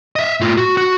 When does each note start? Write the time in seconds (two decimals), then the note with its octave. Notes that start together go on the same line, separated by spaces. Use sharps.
0.16 D#5 E5
0.40 A2 F4
0.58 F#4
0.77 F#4